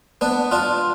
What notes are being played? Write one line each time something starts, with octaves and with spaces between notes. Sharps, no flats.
B3 D4
D4 F4